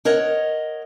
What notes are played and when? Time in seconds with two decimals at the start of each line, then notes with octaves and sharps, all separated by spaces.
0.05 A#4 C#5 D#5 F#5